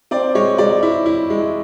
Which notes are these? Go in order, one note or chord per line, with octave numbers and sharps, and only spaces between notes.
C4 D5
G#3 C#5
G#3 D5
E4
E4
G#3